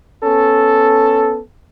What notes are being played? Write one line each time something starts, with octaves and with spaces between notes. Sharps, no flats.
B3 C#4 A4